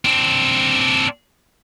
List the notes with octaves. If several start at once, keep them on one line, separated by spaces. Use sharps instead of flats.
C4 D4